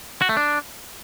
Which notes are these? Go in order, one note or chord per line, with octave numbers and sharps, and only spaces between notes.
F#4
A3
D4